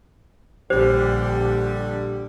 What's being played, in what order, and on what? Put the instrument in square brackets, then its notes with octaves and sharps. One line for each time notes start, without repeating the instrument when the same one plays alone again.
[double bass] A#1 [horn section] D3 G3 [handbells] G4 [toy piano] C5